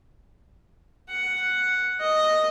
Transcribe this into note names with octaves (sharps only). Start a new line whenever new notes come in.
F#5
D#5